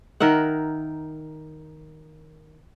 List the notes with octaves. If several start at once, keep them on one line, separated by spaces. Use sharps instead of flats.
D#3 A#4 E5 F#5